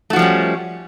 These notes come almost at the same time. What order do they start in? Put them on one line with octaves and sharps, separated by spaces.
A3 F#4 F3 G3 C#4